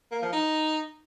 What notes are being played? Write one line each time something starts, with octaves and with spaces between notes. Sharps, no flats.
A#3
F3
D#4